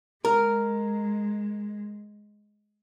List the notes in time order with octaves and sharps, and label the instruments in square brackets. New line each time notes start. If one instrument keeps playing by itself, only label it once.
[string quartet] G#3 [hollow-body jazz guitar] A#4